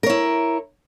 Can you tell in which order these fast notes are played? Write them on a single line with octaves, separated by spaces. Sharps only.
A#4 C#5 E4